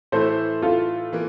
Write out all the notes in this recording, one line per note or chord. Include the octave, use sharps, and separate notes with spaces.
A2 E3 A3 E4 A4 C5
F4 A4
E3 A#3